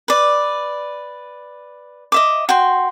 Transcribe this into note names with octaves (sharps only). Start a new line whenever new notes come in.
B4 D5
D#5 E5 D6
F#4 G5 C6